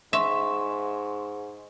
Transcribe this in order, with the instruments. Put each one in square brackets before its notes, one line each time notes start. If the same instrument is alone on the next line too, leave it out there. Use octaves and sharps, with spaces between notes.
[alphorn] G#2 [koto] E5 [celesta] C6 C#6